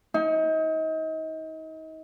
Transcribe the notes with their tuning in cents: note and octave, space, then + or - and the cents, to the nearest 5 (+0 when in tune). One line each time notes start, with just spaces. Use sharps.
D#4 +35